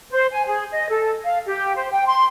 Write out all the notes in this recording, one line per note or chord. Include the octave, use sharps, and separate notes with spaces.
C5
G#5
G#4
D#5
A4
F5
G4
C5
G5
C6